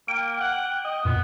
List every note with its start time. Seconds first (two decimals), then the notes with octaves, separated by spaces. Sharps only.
0.08 A#3 G5
0.40 F#5
0.85 D#5
1.05 F2 A#2 B3